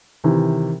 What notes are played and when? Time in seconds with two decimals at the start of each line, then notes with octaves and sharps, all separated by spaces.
0.24 C3 D#3 E3